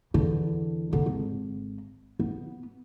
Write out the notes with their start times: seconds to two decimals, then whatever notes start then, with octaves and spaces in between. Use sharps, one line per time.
0.14 E2 D3
0.93 D3 D#4
1.06 G#1
2.19 B3